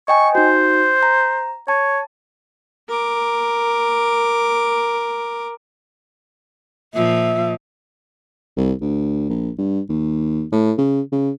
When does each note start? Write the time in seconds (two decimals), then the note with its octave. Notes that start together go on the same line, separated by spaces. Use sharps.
0.08 D#5 G5 G#5 C#6
0.35 D#4 F#4 C5
1.03 A#5
1.68 C#5 A5
2.89 A#4 D6
6.94 A#2 F3 E5
8.57 C2
8.81 D2
9.30 A#1
9.59 G2
9.89 D#2
10.53 A2
10.78 C#3
11.12 C#3